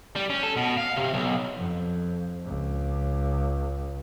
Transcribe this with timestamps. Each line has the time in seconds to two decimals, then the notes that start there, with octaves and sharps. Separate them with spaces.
0.16 G3
0.30 C#4
0.43 A4
0.57 B2
0.77 F5
0.96 C3
1.14 B1
1.57 F2
2.45 C#2